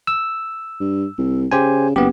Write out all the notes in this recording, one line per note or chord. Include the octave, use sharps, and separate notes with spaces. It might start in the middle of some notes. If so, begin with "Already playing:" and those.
E6
G2
C2
C#3 G4 C5 G#5
F#1 B3 G4